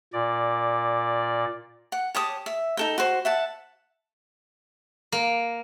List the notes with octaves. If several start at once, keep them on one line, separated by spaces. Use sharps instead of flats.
A#2 D5
F#5
G4 C#5 A5 D#6
E5
D#4 A4 G5
F#4 C5
E5 F#5 A5
A#3